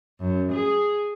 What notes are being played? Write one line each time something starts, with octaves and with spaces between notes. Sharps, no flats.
F#2
G#4